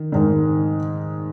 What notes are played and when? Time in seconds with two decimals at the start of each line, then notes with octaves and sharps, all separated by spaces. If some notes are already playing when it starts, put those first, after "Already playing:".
Already playing: D#3
0.12 G#2 D#3